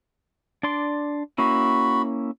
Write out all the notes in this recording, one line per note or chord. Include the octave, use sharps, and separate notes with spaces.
D4 D5 C6
A#3 C#4 E4 F#4 B5